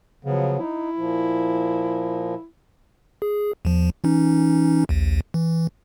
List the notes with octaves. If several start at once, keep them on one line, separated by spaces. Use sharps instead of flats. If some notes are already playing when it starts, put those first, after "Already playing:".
C#3 F3 F#3 B3
D#4 E4
A#2 F3
G#4
E2 F3
E3 C#4 D#4
A#1 D#2
E3